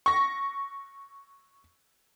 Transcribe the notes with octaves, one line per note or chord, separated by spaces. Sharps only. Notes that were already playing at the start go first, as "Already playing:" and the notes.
C#6 A#6